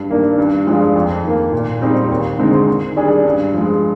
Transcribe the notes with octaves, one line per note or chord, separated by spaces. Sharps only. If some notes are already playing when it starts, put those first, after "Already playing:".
Already playing: G2
D#3 A#3 D4
G2
F3 G#3 D4 F4
F2
D#3 A#3
A#2
G3 C4 D#4 G4
D#2
D3 G#3 C4 D#4
D#3
G3 D4 G#4
G2
F3 G#3